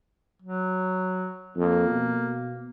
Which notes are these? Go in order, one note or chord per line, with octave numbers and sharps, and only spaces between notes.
F#3
F2 A#3
B2